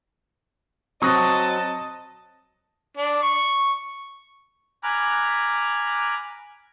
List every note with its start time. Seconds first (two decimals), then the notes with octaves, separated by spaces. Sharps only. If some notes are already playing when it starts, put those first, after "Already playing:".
1.02 F#3 C4 D#5 A5 C#6 D#6 F#6 A#6
2.97 D4
3.22 C#6
4.83 G#5 A#5 B5 D6 F6 F#6